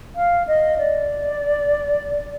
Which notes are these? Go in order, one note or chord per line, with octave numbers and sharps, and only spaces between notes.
F5
D#5
D5